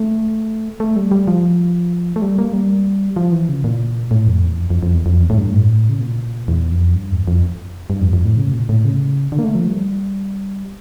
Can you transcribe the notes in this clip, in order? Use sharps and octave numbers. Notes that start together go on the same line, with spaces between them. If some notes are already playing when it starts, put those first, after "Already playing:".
Already playing: A3
A3
G3
G3
F3
A3
G3
A#3
G3
F3
E3
C#3
A#2
A2
F2
E2
F2
F2
F2
E2
F2
E2
A2
G2
A2
C#3
A#2
E2
F2
G2
E2
F2
G2
F2
F2
A2
C#3
A#2
A2
C#3
D3
A#3
A3
F3
G3